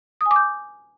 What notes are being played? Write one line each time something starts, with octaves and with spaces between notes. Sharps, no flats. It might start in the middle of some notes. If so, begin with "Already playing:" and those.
D#6
G#5
D6
G6